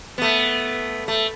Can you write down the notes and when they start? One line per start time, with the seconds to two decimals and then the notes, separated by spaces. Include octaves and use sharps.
0.18 A3 B3
1.08 A3